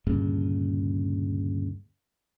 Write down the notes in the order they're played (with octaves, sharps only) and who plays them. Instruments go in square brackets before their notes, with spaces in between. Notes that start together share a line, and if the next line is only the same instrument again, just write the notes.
[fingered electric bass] D2 G2 A#2 C#3